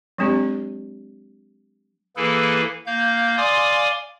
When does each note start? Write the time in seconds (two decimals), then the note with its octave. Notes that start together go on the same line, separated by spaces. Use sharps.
0.18 F#3 G#3 C4 D4 G4
2.17 E3 A#3 E4 G#4 A4 B4
2.86 A#3 F5 G6
3.37 D5 F5 G#5 C6 D6 D#6